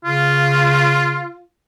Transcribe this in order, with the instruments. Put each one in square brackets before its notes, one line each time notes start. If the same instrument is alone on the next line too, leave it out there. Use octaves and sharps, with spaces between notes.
[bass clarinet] C#3 [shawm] F4